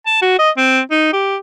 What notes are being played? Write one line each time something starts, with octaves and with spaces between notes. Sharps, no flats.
A5
F#4
D#5
C4
D#4
G4